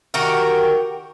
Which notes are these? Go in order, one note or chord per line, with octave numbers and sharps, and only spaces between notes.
D#3 F#4 G4 A#4